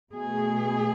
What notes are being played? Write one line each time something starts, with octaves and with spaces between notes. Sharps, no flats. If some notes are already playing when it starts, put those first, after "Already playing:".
B2 A3 G#4